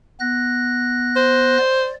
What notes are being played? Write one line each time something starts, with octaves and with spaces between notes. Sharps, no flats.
B3 F#6 A#6
C5
D5